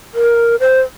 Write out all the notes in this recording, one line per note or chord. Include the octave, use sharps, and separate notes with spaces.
A#4
C5